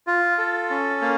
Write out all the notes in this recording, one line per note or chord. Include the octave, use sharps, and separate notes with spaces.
F4
A4
C#4
A#3